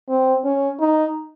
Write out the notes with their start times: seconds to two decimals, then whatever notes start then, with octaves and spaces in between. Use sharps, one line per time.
0.09 C4
0.44 C#4
0.80 D#4